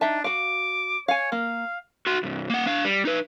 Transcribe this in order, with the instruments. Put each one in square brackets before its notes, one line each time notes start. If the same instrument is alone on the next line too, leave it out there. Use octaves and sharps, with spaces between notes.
[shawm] D4 [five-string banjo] D#4 E5 A5
[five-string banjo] F#4 F5 [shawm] D6
[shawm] C#5 [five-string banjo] F5 G#5
[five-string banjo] A#3 [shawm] F5
[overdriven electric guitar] F#4 C6
C2 G2
A#3 F#5
D4 F5
G3
D#4 B4